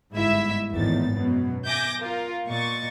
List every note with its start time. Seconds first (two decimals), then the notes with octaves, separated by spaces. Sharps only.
0.13 G1 G#2 E4 E5 E6
0.72 G#1 E2 A2 D#3 A6
1.13 F#2 B2 F#3
1.66 E5 G#5 D6 G6 A#6
1.98 F4 A#4
2.48 A#2 D#5 C#6 A6